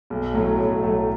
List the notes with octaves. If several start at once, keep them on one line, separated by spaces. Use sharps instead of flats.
B1
A2 F#3 A3
B1
A2 F#3 A3